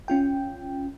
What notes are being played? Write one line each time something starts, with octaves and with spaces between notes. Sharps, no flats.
C#4 F4 G5